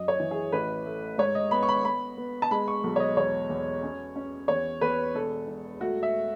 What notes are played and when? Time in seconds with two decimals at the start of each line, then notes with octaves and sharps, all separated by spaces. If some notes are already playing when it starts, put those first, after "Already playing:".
Already playing: F#2 D#5
0.08 C#5
0.20 E3
0.31 G#4
0.52 A1 B4
0.86 A3
1.18 G#2 C#5
1.35 D#5
1.51 B3 B5
1.63 C#6
1.68 B5
1.84 B3 B5
2.17 B3
2.42 A5
2.51 G#3 B5
2.68 C#6
2.84 B1
2.96 C#5
3.00 D#5
3.17 E2 C#5
3.50 E2
3.83 C#4
4.16 C#4
4.48 E2 C#5
4.81 E2 B4
5.15 E1 A4
5.48 E1
5.80 A3 F#4
6.03 E5